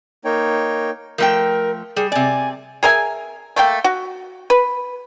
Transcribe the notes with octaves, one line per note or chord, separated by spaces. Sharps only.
A#3 D#4 C#5 G5
F3 A3 A#4 G5
G3 G#4
C3 D5 G#5
G#4 A#4 E5 G#5
A3 A#3 A4 G5
F#4
B4